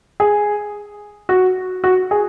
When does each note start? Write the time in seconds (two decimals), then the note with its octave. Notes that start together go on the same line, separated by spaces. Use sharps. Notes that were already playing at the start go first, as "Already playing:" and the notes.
0.20 G#4
1.29 F#4
1.84 F#4
2.11 G#4